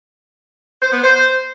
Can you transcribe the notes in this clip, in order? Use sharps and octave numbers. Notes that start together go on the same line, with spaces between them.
C5
B3
C5